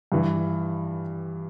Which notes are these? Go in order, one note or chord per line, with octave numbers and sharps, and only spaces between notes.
G2 E3